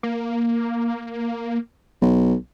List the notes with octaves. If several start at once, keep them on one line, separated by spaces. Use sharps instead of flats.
A#3
B1